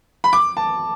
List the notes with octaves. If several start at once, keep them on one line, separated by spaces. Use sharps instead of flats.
B5
D6
A5